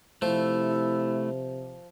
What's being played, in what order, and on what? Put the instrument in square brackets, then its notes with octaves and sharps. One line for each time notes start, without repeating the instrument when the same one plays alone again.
[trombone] C3 [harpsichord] F3 [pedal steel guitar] A3 [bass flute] E4